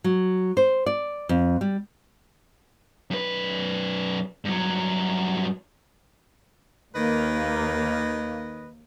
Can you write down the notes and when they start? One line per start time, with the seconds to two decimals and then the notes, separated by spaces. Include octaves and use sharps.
0.04 F#3
0.57 C5
0.86 D5
1.29 F2
1.61 G3
3.11 F#2 B4
4.45 G2 F#3
6.95 D#2 D#3 A#3 B4 D#5